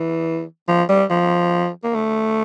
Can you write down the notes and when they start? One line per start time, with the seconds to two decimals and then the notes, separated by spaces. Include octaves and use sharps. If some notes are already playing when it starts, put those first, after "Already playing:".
Already playing: E3
0.68 F3
0.89 G3
1.10 F3
1.84 A#3
1.95 A3